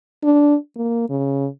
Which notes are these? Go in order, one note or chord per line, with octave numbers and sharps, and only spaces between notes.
D4
A#3
C#3